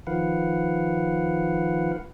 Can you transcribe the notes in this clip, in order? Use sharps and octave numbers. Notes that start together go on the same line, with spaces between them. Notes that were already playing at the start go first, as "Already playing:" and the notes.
D#3 F3 B4 F5 F#5